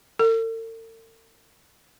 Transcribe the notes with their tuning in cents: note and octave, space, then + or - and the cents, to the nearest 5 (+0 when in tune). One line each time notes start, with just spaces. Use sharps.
A4 +45